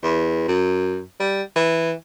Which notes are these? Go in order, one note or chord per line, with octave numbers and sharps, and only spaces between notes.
E2
F#2
G3
E3